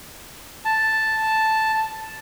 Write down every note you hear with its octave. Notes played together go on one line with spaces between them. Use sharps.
A5